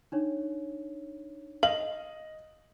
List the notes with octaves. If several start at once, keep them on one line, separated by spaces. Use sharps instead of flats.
D4 D#4 C#5
D#5 F5 F#7